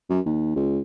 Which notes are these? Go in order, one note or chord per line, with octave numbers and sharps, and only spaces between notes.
F#2
D#2
C#2